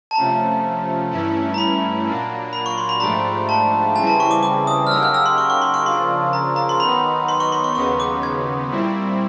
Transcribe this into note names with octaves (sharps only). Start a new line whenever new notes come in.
A5
C3 F3 A3 C#4 A#5
G2 E3 A3 C#4 E4
A#5
B5
A#2 F#3 A#3 D4
B5
C#6
C6
B5
G#2 F3 A3 D4 G4 A#5
A5
C#3 E3 G3 C4 E4 G#5
A5
C#6
D6
D6
D#6
F6
C#3 F#3 A#3 D#4 G4 E6
F6
E6
C6
C#6
C#6
C6
C#6
C#3 F3 A#3 D4 F4 C6
A#5
A#5
C6
D#3 F#3 B3 D#4 B5
C6
C#6
C6
C#6
D#2 C#3 F#3 B3 D#4 C#6
D6
G#6
A#2 G3 C4 E4